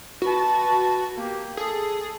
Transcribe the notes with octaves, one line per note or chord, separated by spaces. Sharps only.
F#4 B4 A5
A#3 G4
G#4 A4